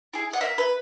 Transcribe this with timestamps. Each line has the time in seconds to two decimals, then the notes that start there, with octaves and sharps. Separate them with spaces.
0.14 E4 G#4
0.33 F#5
0.41 A#3 E5
0.58 B4